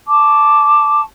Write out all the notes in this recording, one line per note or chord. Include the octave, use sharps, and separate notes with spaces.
A5 C#6 D6